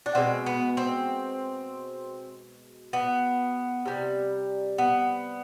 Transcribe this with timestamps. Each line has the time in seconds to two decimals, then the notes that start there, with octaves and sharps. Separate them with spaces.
0.06 D4
0.15 B2 G#3 C4
0.46 B3
0.77 C4
2.93 B3
3.86 C3 G3
4.78 B3